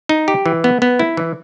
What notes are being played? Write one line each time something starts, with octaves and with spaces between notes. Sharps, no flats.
D#4
G4
E3
B3
B3
E4
E3